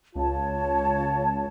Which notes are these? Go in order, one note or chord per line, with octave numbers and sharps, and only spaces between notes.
C#2 F4 C#5 A5